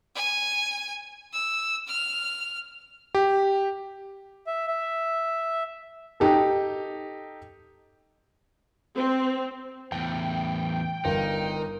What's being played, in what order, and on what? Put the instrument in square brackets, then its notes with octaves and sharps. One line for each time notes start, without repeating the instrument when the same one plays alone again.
[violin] G#5
E6
F6
[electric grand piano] G4
[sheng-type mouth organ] E5
E5
[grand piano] D#4 G4 A4
[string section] C4
[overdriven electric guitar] E2 A2 [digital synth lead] G5
[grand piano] G1 [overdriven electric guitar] D#4 [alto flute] A#4